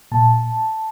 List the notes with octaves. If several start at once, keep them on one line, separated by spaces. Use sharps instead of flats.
A#2 A5